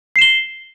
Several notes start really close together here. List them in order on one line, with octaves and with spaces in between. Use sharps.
C7 E7 G7